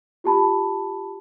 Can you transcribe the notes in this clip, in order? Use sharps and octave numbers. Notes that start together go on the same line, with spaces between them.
F4 G4 A5 B5